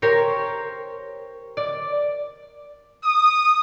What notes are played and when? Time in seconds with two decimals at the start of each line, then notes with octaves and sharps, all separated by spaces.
0.02 G4 A#4 C5 C#5
1.57 D5
3.04 D#6